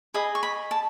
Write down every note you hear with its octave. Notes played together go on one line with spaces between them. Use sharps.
G#4 D#5 B5
C#6
B5
A5